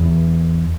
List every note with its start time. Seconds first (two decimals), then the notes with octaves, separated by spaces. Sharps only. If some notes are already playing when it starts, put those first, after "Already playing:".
Already playing: E2